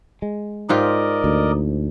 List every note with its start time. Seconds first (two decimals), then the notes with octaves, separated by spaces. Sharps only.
0.22 G#3
0.69 G#2 F4 G4 A#4 D5 D#5
1.24 D2